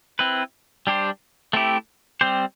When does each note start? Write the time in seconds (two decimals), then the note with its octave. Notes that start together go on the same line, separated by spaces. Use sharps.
0.19 C4 E4 B4
0.87 G3 D4 G4 C5
1.53 A3 C4 E4 G4
2.21 G3 C4 G4 C5